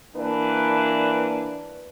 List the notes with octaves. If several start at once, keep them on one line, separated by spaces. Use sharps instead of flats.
E3 A#3 D4 B4